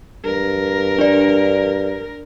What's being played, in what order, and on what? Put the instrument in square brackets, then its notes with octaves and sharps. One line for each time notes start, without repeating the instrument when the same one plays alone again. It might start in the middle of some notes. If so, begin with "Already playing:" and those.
[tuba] G2 [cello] A#4
[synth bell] D4 D5